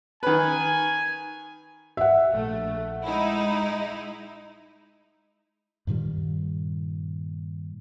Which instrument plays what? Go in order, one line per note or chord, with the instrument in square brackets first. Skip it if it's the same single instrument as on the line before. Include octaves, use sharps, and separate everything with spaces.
[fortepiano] D#3 B4 [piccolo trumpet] G#5
[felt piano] E5 F#5
[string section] A#1 A3
G#3 D#4 E4
[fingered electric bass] G2 A#2 D#3 G3